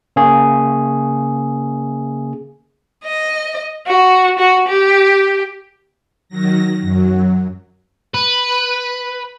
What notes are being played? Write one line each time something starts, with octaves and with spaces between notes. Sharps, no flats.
C#3 A#3 G#4
D#5
F#4
F#4
G4
D#3 F#3 A#6
F#2 F#3
B4